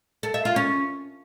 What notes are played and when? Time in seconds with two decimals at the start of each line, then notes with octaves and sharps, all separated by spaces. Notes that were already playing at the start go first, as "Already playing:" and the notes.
0.23 A4
0.34 E5
0.45 F4
0.56 C#4